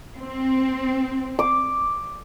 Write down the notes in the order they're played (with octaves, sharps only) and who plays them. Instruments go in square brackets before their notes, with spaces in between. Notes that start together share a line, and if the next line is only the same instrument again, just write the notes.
[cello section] C4
[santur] D6